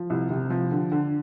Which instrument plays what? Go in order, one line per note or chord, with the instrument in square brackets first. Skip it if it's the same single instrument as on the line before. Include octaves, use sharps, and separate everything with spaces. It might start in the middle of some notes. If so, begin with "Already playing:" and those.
Already playing: [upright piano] F3
C2
C3
F3
D3
D3